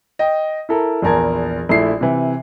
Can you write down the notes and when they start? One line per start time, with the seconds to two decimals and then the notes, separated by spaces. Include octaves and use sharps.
0.19 D#5 G5
0.69 E4 A4 A#4
1.02 A#1 E2 A#4 A5 G#6
1.69 A#1 A3 E4 C7
2.01 C3 E3